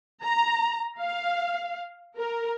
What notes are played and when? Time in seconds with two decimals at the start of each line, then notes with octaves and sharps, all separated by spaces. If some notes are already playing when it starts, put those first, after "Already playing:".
0.24 A#5
0.99 F5
2.18 A#4